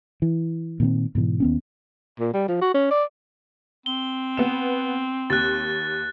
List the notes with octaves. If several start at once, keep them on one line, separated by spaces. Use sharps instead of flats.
E3
A#2 D#3 B3 C4
G#2 B2 D#3 E3
D#2 B3 C#4
A#2
G3
F3
F#4
C#4
D5
C4 G7
B3 E7
D#2 F#6 A6